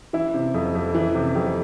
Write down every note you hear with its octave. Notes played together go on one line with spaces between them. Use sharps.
E3 E4
C3
F2
F2
E3
C3
F2 G4